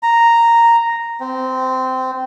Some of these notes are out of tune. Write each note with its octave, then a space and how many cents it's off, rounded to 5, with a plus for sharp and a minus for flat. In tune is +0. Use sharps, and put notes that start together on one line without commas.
A#5 -5
C4 -15